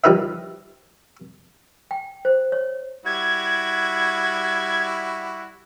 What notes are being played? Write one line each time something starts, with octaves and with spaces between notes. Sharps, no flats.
F3 G3 D#4 A#4 B4 E5
G5
C5
C#5
G3 E4 F#4 G#6